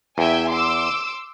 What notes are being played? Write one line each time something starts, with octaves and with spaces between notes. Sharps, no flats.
E2 E5 G5 G#5
C6 D6 E6